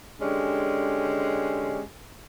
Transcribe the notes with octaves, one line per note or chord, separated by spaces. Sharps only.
D3 G#3 C#4 D4 G4